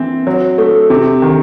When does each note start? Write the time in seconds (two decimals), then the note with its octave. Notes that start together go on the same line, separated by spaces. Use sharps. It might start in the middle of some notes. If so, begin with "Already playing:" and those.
Already playing: E3 C4
0.27 F#3
0.58 A3
0.90 C3
1.22 D#3